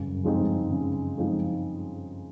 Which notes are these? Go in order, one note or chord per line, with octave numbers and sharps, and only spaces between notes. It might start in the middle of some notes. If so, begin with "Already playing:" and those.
Already playing: G2 C#3
F#2
F3 G#3 C4 D#4
G2
C#3
F3 G#3 C4 D#4